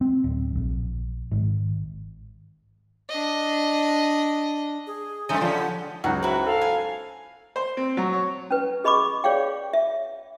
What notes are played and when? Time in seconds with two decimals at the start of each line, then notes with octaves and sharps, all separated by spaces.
0.01 C4
0.24 D1
0.55 A#1
1.32 G#1
3.09 D4 D#5
4.87 G#4
5.29 F2 G#3 C4 D#4 A4 D#5 E5 G#5
5.41 D3 F3 G3 C#4 F4 C5 D5
5.55 F#5
6.04 C#2 F#3 D#4 F#4 A#5
6.23 E4 F#4 B4 C5 A#5
6.47 A4 F5
6.61 G#5
7.56 C5
7.77 C4
7.97 F#3
8.13 C#5
8.51 C#4 B4
8.84 G#4 D#5 B5 C#6 D6
9.24 G#4 C#5 D5 F5 G5
9.73 E5